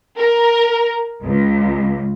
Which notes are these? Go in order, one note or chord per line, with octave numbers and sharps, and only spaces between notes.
A#4
C#2